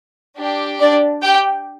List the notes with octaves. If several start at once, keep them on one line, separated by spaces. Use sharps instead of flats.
D4 G4
D4 D5
G4 G5